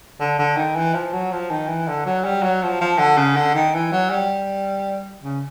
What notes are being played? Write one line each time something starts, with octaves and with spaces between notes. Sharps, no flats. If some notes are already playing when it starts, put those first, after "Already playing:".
D3
D3
D#3
E3
F3
F#3
F3
D#3
E3
D3
F#3
G3
F#3
F3
F3
D3
C#3
D3
D#3
E3
F#3
G3
C#3